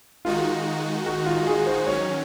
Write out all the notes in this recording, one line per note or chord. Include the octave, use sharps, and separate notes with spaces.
D#3 G#3 D#4 F4 F#4
F#4
F4
G#4
C5
D#3 F#3 C#4 C#5